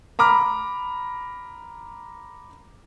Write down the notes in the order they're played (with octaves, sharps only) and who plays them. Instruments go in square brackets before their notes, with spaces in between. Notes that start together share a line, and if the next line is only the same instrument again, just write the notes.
[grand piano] A#5 B5 D6 F6